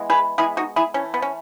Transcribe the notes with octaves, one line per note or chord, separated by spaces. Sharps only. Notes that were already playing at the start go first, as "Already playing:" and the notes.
Already playing: E3 G#3 B3
G#4 B4
E3 G#3 B3 E4 G#4
D#4 F#4
E4 G#4
E3 A3 C#4
B3
C#4